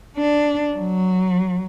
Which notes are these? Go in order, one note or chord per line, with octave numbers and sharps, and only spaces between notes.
D4
F#3